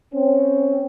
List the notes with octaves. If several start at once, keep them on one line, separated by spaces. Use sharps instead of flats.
C4 C#4